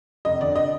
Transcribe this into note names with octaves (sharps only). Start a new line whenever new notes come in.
F1 D#5
D3 D5
D#5